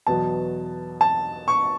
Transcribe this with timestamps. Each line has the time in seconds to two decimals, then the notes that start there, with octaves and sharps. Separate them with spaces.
0.07 E2 B2 F#3 B3 A5
1.01 A5
1.48 C#6